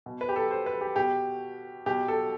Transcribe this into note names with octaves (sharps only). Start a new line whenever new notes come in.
B2
B4
G4
A4
C5
B4
G4
B2 G4
B2 G4
A4